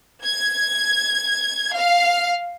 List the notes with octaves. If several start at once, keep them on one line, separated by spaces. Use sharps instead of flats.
G#6
F5